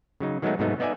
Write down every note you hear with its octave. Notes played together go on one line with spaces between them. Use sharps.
C#3 F#3 D#4
D#3 F#3 G#3 A3 B3 D#4
G#2 C3 F#3 A3 B3 D#4
B3 D#4 D5 E5 G#5